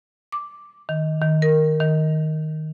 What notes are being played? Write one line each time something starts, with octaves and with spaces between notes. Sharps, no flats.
D6
D#3
D#3
A#4
D#3